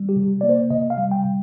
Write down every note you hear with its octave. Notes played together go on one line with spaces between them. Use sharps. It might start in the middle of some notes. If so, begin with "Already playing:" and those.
Already playing: G3
G4
C3
A#3 D5
C5
C3 D#5
F5
G3
G5
C3